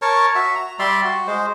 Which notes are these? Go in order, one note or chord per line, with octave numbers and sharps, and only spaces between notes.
A#4 C#5 A5
F#4 E5
A#5
G3 D5 E5 C6
F#4
G#3 C5